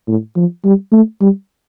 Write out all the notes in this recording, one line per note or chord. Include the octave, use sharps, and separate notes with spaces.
A2
F3
G3
A3
G3